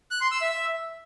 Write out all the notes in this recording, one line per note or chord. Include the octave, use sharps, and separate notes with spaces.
F#6
C6
E6
E5